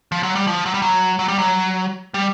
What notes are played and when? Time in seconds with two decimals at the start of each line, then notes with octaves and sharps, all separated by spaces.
0.12 F3
0.23 F#3
0.35 G3
0.47 F3
0.66 F#3
0.74 G3
0.82 F#3
1.19 F#3
1.28 G3
1.38 F#3
2.14 G3